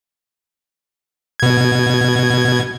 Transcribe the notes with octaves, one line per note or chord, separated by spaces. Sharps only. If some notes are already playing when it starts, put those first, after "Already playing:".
B2 G#6